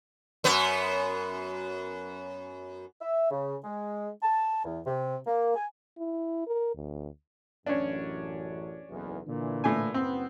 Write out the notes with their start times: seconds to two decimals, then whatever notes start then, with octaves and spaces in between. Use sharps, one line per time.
0.44 F#2 B3
3.01 E5
3.31 C#3
3.64 G#3
4.23 A5
4.65 E2
4.86 C3
5.27 A#3
5.56 G#5
5.98 E4
6.47 A#4
6.75 D2
7.66 A1 F#2 C#4 D4
8.89 F#1 B1 E2
9.26 A#2 D3 E3
9.64 A2 G#5
9.94 F#1 F#2 B3 C4